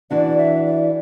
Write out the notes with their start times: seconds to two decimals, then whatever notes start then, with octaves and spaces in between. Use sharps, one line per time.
0.10 E3 D4 F#4 D5
0.38 E5
0.65 D5